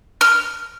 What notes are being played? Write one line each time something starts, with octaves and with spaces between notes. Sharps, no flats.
F6